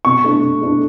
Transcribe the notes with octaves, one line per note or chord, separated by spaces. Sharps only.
B2 C#6
A3 D4
B2
A3 D4